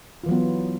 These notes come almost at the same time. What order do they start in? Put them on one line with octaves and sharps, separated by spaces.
F4 E3 F#3 B3